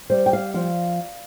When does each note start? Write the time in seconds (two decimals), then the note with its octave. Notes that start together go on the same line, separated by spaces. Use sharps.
0.10 G3 C5
0.26 G5
0.33 F5
0.54 F3 F5